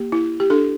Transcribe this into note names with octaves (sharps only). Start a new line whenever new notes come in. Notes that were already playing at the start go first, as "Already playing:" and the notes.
Already playing: A#3 G4
E4
G4
D4 A4